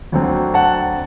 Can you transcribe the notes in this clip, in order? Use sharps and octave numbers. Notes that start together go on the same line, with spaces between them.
D2 D3 F#3 C4
F#5 A5